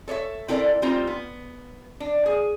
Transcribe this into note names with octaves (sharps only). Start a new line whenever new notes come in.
A4 C#5 D5 E5
C4 E4 A4 A#4 C5 D5
G3 A3 C4 D#4 F4
B3
D4
G#4